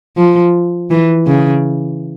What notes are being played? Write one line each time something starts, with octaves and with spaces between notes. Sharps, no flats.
F3
E3
C#3